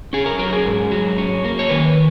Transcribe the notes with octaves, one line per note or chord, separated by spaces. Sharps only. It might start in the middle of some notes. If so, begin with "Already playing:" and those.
C#4 G#4
A#4
F#3 A#4
G#4
G#2
F#3
C#4
A#3
C#5
D#3 B4